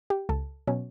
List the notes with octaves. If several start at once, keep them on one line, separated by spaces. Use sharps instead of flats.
G4
C#2 A4
B2 F#3 C#4